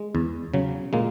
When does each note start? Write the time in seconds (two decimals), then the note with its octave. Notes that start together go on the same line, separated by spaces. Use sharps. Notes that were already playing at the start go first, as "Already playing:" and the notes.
Already playing: G#3
0.15 E2
0.54 C#3 F#3
0.93 A#2 G#3 A#3